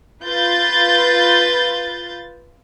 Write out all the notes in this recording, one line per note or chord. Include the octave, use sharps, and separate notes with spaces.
F4 B4 G6 A6